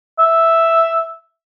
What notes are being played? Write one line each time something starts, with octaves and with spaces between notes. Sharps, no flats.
E5